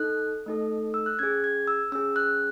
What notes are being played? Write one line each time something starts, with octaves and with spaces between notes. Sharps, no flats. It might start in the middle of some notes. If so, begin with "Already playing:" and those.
Already playing: D#4 A4 F#6
A3 D#4 A4
E6
F#6
C#4 G#4 G#6
G#6
E6
C#4 G#4 E6
F#6